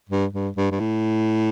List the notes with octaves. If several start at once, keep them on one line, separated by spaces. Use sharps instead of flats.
G2
G2
G2
G2
A2